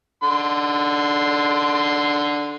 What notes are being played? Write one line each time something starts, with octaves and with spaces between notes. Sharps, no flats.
D3 C6